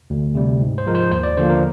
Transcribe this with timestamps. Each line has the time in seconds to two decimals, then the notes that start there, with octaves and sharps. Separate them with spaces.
0.10 D2
0.35 C3 G3
0.61 G#2
0.78 C5
0.87 F3 G#3 A#4
0.95 C5
1.11 D#2 C5
1.23 D5
1.37 D3 F3 A#3 C5
1.50 A#4